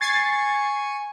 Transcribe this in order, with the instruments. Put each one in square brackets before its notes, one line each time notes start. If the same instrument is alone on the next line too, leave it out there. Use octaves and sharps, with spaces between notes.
[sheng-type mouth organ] G#5 C#6 [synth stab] G#6 A6 C7